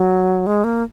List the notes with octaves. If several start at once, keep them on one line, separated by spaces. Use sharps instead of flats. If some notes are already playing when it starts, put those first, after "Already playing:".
Already playing: F#3
G#3
A#3